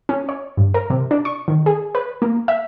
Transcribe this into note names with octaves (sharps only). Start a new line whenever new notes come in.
C#4
C#5
G2
A#4
C3
D4
C#6
D#3
G#4
B4
A#3
E5